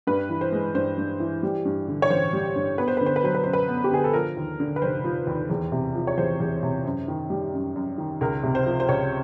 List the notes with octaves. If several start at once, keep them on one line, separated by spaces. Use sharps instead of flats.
G2 B4
E3
C5
G#3
G2 C5
G2
E3
G3
G2
D3
C#5
A1 C5
G3
G2
B3 B4
C5
D3 B4
C5
B4
F#3 C5
B4
F#2 C5
B4
B3
G4
D3 G#4
A4
F3 A#4
D#2
D3
B4
F1 C5
F3
D#2
E2
C3
F3
C#5
E2 C5
E2
C3
F#2
D#3
G3
F#2
F#2
D#3
C#2 A#4
C3
C5
F3
C5
C#2 C#5